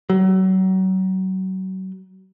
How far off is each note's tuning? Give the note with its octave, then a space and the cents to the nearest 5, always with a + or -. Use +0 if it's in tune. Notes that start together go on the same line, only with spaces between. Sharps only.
F#3 +30